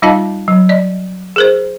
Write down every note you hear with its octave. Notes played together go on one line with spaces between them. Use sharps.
G3 D#4 F4 D#5 F5 A5
F#3
D5 D#5
G#4 A#4 C5